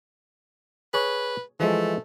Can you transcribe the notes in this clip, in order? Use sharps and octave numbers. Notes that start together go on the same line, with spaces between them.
G#4 B4 C#5
E3 F3 G#3 A3